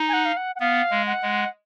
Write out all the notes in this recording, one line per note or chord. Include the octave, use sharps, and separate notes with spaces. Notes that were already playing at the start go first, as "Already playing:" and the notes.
Already playing: D#4
G#5
F#5
F5
F#5
F#5
B3 F5
G#3
F#5
G#3